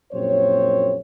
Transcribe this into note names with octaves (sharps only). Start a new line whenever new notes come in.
A#1 F#2 A#2 C4 C5 C#5